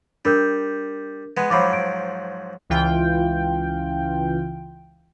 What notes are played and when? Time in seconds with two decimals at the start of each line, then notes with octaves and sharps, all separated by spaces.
0.25 G3 D4 A#4 G6
1.37 G#3 B3
1.50 G#2 F3 F#3 B5 D6
1.73 D7
2.70 C#2 E3 F4 G5